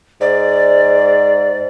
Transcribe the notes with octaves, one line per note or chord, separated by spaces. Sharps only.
G#2 D5